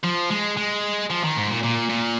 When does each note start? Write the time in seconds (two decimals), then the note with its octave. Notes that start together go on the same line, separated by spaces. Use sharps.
0.04 F3
0.30 G#3
0.57 G#3
1.10 F3
1.24 D#3
1.37 G#2
1.50 A#2
1.63 A#2
1.89 A#2